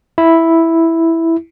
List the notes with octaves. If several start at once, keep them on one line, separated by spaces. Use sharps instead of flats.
E4